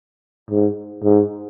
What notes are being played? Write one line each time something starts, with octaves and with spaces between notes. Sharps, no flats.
G#2
G#2